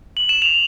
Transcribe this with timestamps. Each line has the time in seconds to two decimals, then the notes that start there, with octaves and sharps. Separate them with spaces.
0.17 F#7
0.29 E7
0.42 F7